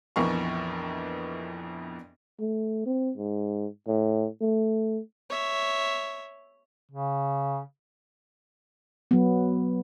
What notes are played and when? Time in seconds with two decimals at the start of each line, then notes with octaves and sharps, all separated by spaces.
0.16 A#1 F2 E3 B3 A#4 C#6
2.40 A3
2.86 C4
3.17 G#2
3.87 A2
4.41 A3
5.30 C#5 E5
6.92 C#3
9.11 F#3 B3